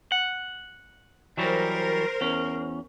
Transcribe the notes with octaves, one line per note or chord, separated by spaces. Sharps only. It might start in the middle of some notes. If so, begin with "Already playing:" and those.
F#5
E3 F#3 G3 A#4 C5
E2 C#4